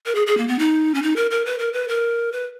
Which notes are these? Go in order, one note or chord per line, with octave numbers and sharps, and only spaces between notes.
A#4
G#4
G#4
A#3
B3
D#4
C#4
D#4
A#4
A#4
B4
A#4
B4
A#4
B4